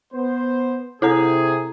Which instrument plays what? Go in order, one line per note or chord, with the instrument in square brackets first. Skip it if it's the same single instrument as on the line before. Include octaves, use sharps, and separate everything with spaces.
[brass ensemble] B3 C5
[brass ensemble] C3 G#4 [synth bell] E4 A4 A#5